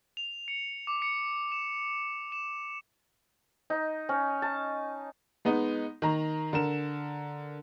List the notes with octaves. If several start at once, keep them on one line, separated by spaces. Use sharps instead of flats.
F7
C#7
D6
C#7
E7
E7
D#4
C#4
A5
G#3 B3 D#4
D#3 A#5
D3 A#4 E7